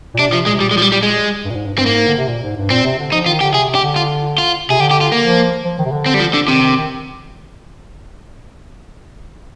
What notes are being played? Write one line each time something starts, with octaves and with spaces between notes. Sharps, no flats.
A#2
C3 D4
A#2
C3 F3
A#2 G#3
C3
A#2 G3
G#3
F3
G3
G3
G#3
G2
A#2
G#2
G2
G2 C4
G#2 A#3
D3
C3
A#2
G#2
G2
A#2 C4
C3
D3
F3 D#4
D#3 F4
D3 G4
C3 G#4
C3
G4
D3
F4
F4
C3 G#4
D3 G4
G4
F4
A#3
F3
F3
D#3
C3
D3
C4
G3
F3
D3
C3 D#3
D#3
D#3